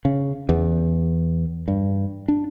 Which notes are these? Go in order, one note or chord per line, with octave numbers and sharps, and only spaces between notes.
C#3
E2
G2
D4